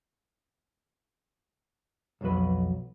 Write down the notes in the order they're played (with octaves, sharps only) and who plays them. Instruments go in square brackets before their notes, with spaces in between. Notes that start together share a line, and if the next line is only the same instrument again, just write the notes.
[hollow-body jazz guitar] B1 F2 F#3 F#4 B4